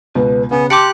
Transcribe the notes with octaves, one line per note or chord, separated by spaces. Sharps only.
C#2 B2 B4
C#3 B3 G#5
G4 A5 C6 D6 F#6 C#7 D7